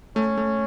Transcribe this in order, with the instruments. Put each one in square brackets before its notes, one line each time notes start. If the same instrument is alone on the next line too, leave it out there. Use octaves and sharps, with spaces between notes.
[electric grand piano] A3 [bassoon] C#4
[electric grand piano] A3